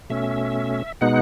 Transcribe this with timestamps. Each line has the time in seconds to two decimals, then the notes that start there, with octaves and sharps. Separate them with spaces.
0.10 B2 A3 C#4 E5
1.01 B2 G#3 B3 D#4 F#5